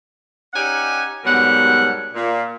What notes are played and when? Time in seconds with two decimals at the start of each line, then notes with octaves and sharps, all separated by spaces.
0.53 C#4 D#4 G4 D5 F#5 G#5
1.24 G#2 B2 F#3 G3 A#4 F#5
2.14 A#2